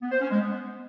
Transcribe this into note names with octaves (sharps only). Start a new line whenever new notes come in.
B3
C5
C#4
G#3
B3